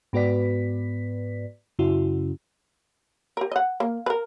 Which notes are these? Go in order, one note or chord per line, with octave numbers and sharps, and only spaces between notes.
G#2 B3 F#4 B4 D5 B6
F#2 C#3 C#4 E4 F#4
G4 A#4
D#5 F#5
A#3
A#4 B4